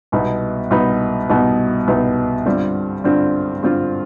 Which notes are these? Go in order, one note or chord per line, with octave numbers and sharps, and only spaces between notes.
C2 B2 B3 D#4 B4
C2 B2 B3 D#4 B4
C2 B2 B3 D#4 B4
C2 B2 B3 D#4 B4
G2 D3 G3 C4 F4
G2 D3 G3 C4 F4
G2 D3 G3 C4 F4